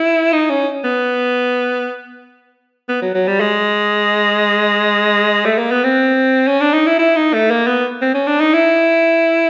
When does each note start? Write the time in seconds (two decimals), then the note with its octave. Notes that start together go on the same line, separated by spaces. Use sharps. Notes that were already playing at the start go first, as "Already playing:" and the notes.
Already playing: E4
0.33 D#4
0.50 C#4
0.84 B3
2.89 B3
3.02 F#3
3.15 F#3
3.28 G3
3.40 G#3
5.45 A3
5.58 A#3
5.71 B3
5.84 C4
6.48 C#4
6.61 D4
6.74 D#4
6.86 E4
6.99 E4
7.16 D#4
7.33 A3
7.51 A#3
7.67 B3
8.02 C4
8.14 C#4
8.27 D4
8.40 D#4
8.53 E4